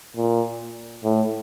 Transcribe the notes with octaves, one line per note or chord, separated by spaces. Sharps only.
A#2
A2